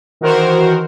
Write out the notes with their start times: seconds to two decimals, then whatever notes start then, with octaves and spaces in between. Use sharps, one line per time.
0.21 D#3 E3 F#4 A#4 C5